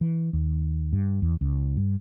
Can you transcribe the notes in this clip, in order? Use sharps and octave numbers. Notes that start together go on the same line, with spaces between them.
E3
D#2
G2
E2
C#2
G2